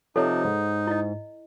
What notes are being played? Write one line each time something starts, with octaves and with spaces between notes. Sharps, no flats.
C3 F3 D#4 A4 C#5
G#2
E4 D#5